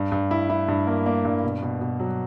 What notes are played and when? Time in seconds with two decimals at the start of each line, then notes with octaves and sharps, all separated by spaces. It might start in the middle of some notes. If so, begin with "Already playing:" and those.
Already playing: G2
0.12 G2
0.31 E4
0.50 E4
0.68 G2
0.87 A#3
1.06 A#3
1.25 G2
1.43 B2
1.62 B2
1.81 B2
2.00 F#3